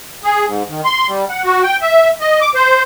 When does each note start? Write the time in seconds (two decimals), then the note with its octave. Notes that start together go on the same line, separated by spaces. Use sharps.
0.24 G#4
0.46 G#2
0.69 D#3
0.84 C6
1.08 G3
1.30 F#5
1.44 F#4
1.63 G5
1.81 E5
2.21 D#5
2.41 D6
2.55 C5